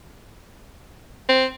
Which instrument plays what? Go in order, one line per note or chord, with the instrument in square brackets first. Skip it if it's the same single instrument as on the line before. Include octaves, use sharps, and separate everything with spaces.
[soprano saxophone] C4